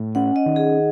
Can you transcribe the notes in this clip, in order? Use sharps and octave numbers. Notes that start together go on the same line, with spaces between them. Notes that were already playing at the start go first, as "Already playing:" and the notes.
Already playing: A2
C#4 F#5
D#5
D#3
G#4